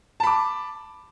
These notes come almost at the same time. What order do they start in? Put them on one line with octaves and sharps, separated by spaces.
A5 B5 D6